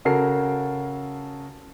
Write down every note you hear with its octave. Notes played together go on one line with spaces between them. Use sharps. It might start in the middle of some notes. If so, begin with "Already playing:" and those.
C#3 F#4 A4 A#4 C7